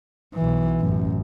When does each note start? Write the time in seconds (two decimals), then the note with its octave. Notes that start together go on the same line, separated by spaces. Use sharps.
0.34 B1 E3
0.80 A1 F#2